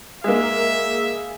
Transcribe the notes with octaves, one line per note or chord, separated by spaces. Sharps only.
G#3 A#3 G#4 E5 F5